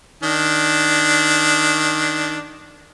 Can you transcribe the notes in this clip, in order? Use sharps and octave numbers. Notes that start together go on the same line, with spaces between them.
D#3 D4